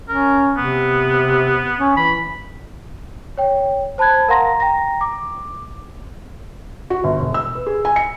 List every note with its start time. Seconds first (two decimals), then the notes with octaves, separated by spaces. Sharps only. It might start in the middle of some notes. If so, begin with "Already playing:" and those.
0.09 C#4 A#4
0.57 C3 B3
1.78 C#4
1.97 E3 B5
3.37 C#5 G5
3.98 C5 A5 B5 F#6 G#6
4.28 A#4 F5 F#5 A#5 C6 A#6
4.60 G5 A#5 A#6
5.01 D6
6.90 F#4
7.04 G1
7.19 E1
7.34 E6
7.55 B4
7.66 G#4
7.85 G#5
7.96 C#7